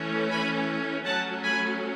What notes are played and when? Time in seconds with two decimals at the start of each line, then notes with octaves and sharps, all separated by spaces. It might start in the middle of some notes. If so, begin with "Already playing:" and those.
Already playing: E3 A3 C#4
0.30 G#5 B5
1.05 F#3 A3 C#4 F#5 A5
1.43 G#5 B5